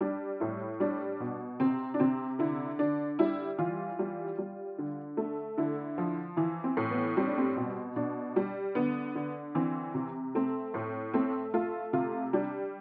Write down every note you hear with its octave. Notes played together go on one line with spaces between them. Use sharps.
G3 D4
A2 E4
G3 D4
B2
C3 C4
D4
C3 C4
D3 E4
D3 D4
G3 E4
E3 F4
G3
G3
D3
A3
D3 E4
F3
E3 E4
C4
A2
B3
G3 C4
D4
C4
B2
B2 D4
G3
D3 B3
D3
E3 C4
C3
A3 C4
A2
A3 C4
A3 F4
C3 F4
G3 D4